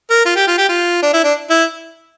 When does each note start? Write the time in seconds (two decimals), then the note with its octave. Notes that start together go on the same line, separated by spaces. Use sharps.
0.10 A#4
0.25 F4
0.36 G4
0.47 F4
0.58 G4
0.69 F4
1.03 D4
1.13 E4
1.24 D4
1.50 E4